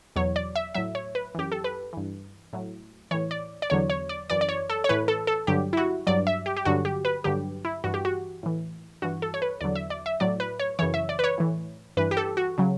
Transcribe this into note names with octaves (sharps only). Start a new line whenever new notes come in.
E2 B2 F#3 C#5
D5
E5
A2 F#3 E5
C#5
B4
F#2 E3 G4
A4
B4
G2 E3
A2 F#3
A2 E3 C#5
D5
D5
E2 D3 F#3 C#5
C#5
D5
F#2 E3 D5
D5
C#5
A4
C#5
A2 E3 B4
A4
A4
G2 D3 F#3 G4
E4
F#4
G2 F#3 D5
E5
G4
G4
G2 D3 F#3 F#4
G4
B4
G2 D3 F#3 G4
E4
G2 E3 F#4
G4
F#4
A2 E3
G2 E3 F#4
A4
C#5
B4
E2 D3 F#3 D5
E5
D5
E5
A2 F#3 D5
B4
C#5
F#2 C#3 E3 C#5
E5
D5
B4
C#5
A2 E3
G2 E3 B4
G4
A4
F#4
C#3 F#3